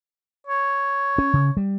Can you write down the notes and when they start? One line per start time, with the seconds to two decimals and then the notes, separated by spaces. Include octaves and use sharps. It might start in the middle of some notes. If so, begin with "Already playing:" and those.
0.47 C#5
1.18 C#4
1.33 C#3
1.57 G3